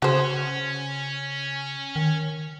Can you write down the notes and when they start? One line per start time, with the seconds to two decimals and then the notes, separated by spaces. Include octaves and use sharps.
0.02 C#3 C#4 F#4 C5
1.96 D#3